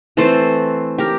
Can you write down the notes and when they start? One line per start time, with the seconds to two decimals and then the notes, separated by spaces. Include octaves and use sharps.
0.17 E3 A3 C4 A4 C5
0.98 G4 A#4